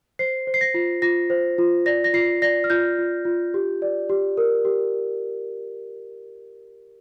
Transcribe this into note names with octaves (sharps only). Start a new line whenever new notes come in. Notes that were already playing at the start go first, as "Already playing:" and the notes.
C5 C7
C5
C7
A#6
F4
F4 A#6
C5
F4
D5 A#6
A#6
F4 C7
D5 A#6
F6
F4 G6
F4
F4
G4
D5
G4
A#4
G4